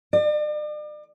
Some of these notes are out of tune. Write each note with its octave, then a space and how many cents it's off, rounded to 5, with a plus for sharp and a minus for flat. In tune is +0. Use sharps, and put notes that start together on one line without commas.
D5 +40